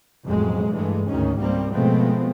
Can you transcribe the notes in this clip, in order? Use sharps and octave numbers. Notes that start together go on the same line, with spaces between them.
A1 F2 B2 F#3 G#3
G2 E3 G#3 A3
D2 G#2 D#3 C#4
C#2 G3 A#3 C4
B2 F3 G#3 A3 B3 C4